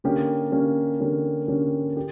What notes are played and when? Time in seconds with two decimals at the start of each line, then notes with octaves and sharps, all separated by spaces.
0.04 D3 A#3 C#4 G4
0.52 D3 A#3 C#4 G4
1.00 D3 A#3 C#4 G4
1.48 D3 A#3 C#4 G4
1.97 G4